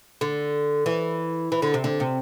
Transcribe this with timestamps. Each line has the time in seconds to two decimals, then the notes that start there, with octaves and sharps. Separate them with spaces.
0.21 D3
0.86 E3
1.52 E3
1.62 D3
1.74 C3
1.84 D3
2.00 C3